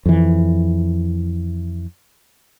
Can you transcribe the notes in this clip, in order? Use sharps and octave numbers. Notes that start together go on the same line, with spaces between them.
F2 E3